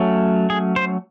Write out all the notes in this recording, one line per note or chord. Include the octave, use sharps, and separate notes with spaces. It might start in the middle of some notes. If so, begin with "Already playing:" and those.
Already playing: F#3 A3 C#4
G#4
C5